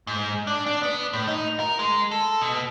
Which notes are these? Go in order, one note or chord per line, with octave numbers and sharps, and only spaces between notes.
G#2
D4
D4
B3
A2
D#4
A#4
G#3
A4
B2